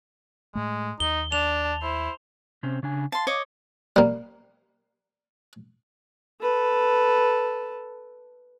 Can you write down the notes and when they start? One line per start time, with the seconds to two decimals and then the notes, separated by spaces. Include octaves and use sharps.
0.55 A2 G#3 A3
1.00 D#2 D#4 G7
1.32 D4 A5 F7
1.82 E4 C5
2.63 C3 C4 C#4
2.83 C#3 D4 G#5
3.12 F5 A5 C6
3.27 C#5 D#5 D6
3.96 G3 A#3
6.41 A4 B4